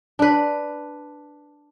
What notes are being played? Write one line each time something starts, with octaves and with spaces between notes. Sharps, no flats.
D4 B4